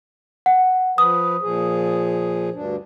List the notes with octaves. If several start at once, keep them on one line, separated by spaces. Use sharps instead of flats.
F#5
F3 B4 D#6
A#2 F3 G#4
D2 G2 D4